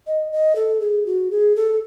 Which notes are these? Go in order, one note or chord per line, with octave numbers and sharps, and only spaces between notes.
D#5
D#5
A4
G#4
F#4
G#4
A4